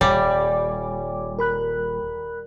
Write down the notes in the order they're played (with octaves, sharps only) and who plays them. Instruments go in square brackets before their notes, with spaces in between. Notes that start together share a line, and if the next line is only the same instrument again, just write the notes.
[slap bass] D#1 [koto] G3 [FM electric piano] C#5 G#5 D6
[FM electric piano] A#4 B5 F#6